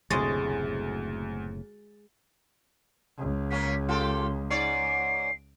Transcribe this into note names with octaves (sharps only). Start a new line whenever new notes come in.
F#1 D2 A2 C3 G#3 C#5 D#5 A6
C#2
C#3 A#3 C#4 B6
F4 G4 A4 C6
G#2 C#5 D5 C7